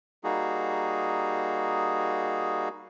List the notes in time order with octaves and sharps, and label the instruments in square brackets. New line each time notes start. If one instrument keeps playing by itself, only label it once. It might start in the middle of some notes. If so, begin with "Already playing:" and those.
[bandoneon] G3 A#3 D#4 F#4 G#4